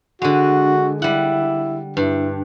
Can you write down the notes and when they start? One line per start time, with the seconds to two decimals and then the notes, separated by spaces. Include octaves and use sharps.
0.22 D3 G#3 F#4
1.02 G3 E4 F#5
1.97 G2 E4